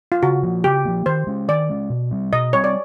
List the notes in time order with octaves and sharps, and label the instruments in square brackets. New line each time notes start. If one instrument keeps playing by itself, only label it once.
[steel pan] F4
[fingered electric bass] C#3 [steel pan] F#4
[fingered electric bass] F3 A#3
[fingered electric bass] C#3 [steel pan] G4
[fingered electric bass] F3 A#3
[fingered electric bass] D#3 [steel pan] C5
[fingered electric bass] G#3 C#4
[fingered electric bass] D#3 [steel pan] D5
[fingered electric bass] G#3 C#4
B2
G3 C4
[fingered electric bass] B2 [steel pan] D#5
[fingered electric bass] G3 C4 [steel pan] C#5
[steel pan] D5